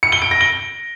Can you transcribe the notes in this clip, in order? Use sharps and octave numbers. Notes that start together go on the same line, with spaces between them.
C#7
G7
D7
A#6
G7